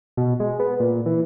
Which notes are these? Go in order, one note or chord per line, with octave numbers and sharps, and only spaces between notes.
B2
G#3
B3
A#2
E3